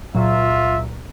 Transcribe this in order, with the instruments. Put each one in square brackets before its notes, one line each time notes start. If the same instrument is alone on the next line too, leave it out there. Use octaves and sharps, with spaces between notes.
[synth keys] C#2 A#2 F#3 [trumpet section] F4 E5